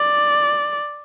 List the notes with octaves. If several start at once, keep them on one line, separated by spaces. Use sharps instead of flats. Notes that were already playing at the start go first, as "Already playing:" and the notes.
Already playing: D5